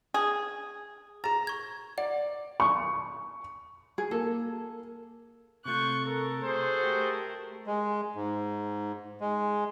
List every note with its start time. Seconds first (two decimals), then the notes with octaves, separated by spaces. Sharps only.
0.14 G#4
1.24 G#4 A#5 A6
1.47 C#6 G#6
1.98 D5 F#5
2.60 C#6
3.98 G#4
4.11 A#3 A4
5.65 C3 A3 F4 C#6 F#6 G6
6.05 A4 A#4
6.45 F#4 G#4 C5
6.83 A3 G4 A#4
7.67 G#3
8.15 G#2
9.21 G#3